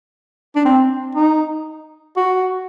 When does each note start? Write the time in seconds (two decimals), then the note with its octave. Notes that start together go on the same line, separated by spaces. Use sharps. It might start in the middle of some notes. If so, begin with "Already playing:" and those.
0.56 D4
0.65 C4
1.15 D#4
2.17 F#4